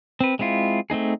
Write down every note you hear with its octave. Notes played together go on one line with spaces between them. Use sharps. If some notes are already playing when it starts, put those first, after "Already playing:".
C4 B4
G#3 C4 E4 F4
A3 C4 D#4 G#4